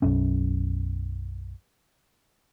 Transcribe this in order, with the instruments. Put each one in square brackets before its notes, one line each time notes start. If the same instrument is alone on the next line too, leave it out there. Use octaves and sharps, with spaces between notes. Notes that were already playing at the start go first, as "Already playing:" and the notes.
[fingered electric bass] B1 F#2 C#4